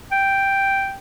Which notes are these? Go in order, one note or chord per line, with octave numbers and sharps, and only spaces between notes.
G5